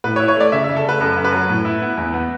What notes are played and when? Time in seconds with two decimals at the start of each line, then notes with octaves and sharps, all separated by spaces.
0.04 A2 B4
0.16 C#5
0.20 E4
0.28 C#5
0.36 A3 D5
0.52 C#3 E5
0.64 C#3 E5
0.76 A4
0.85 A3 B4
1.00 F#2 A4
1.17 F#2
1.24 B4
1.32 F#3
1.49 A2
1.65 E4
1.82 B3
1.97 E2
2.14 B3